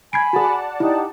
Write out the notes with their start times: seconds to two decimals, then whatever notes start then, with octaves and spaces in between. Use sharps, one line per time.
0.13 G#5 B5 G#6 C7 D7
0.33 F#4 G#4 D5 F#5 A5
0.80 D#4 E4 G4